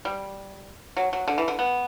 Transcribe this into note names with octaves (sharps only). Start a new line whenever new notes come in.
G3
F#3
F#3
D3
E3
D3
B3